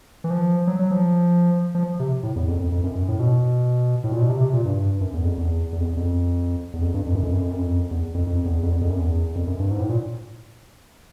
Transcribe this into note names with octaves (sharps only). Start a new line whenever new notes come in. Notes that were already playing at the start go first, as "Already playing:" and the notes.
E3
F3
F#3
F#3
F3
F3
C3
A2
E2
F2
F2
F2
F#2
F#2
A2
B2
A2
A#2
B2
C3
C3
A#2
G2
F#2
E2
F2
E2
E2
F2
E2
F2
E2
F2
G2
F2
F#2
F2
F#2
F2
F#2
F2
E2
F2
F2
E2
F2
E2
F2
F#2
E2
F2
F#2
G2
G#2
A2
A#2